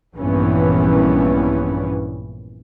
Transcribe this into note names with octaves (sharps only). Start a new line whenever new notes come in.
A#1 G2 A#2 E3 B3 C#4